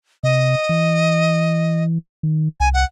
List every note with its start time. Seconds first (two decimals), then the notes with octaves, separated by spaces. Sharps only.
0.23 C3 D#5
0.69 E3
2.23 D#3
2.60 C2 G#5
2.74 F#5